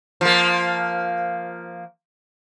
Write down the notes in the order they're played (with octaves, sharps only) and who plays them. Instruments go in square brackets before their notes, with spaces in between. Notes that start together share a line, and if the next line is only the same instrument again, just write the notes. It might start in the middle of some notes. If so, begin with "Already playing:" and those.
[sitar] F3 A#3